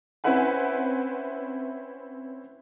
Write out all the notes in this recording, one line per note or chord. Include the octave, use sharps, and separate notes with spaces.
C4 C#4 E4 B4 F#5 G#5